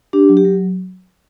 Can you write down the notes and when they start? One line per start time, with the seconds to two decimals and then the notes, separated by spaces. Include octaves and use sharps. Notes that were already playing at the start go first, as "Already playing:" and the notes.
0.13 D4 G4
0.29 F#3
0.37 G4
0.45 F#3